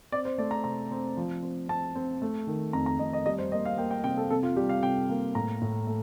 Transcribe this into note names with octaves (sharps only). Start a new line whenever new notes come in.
C4 D5
C5
A3 D5
A#5
C3 A#5
C4
F3
C4
C4 A5
C4
A3
D#3
F2 A#5
A#5
F2 D#5
D#5
G3 D#5
C5
A#3 D#5
F5
A#3 G5
G5
C3 G5
A4
C3 A4
F4
G3 G4
F5
C3 G5
A#3
A2 A#5
A2
A3